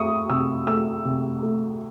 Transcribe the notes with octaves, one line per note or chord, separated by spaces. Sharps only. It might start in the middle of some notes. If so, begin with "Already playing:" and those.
Already playing: A3 E5 C#6 D#6
C3 E6
A3 E6
C3
A3